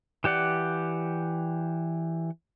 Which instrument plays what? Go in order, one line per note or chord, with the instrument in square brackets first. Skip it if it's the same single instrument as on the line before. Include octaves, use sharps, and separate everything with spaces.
[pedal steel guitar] E3 G4 D5 F#5